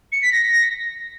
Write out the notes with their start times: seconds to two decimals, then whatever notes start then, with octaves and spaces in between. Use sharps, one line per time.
0.12 C#7
0.22 B6
0.32 A#6